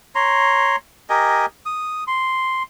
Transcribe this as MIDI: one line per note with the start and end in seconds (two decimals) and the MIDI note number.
0.15 0.76 73
0.15 0.76 82
0.15 0.76 84
1.10 1.46 67
1.10 1.46 70
1.10 1.46 75
1.10 1.46 80
1.66 2.04 87
2.07 2.63 84